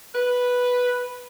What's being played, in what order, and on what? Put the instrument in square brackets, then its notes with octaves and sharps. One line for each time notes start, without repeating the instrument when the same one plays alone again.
[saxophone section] B4